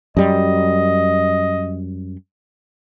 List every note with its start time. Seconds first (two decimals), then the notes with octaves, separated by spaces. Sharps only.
0.17 F#2 G3 D#5